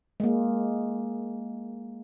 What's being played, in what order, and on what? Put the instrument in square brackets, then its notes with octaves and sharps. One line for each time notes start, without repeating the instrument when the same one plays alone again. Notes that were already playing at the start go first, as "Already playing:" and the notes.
[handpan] G#3 A#3